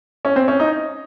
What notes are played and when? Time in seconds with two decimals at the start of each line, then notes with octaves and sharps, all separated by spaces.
0.25 C#4
0.36 C4
0.48 C#4
0.60 D#4